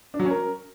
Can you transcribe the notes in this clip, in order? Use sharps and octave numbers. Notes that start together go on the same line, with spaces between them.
D4
F#3
C#4
A#4